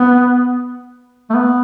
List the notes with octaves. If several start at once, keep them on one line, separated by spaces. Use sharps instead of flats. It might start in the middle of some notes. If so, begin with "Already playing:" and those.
Already playing: B3
A3
B3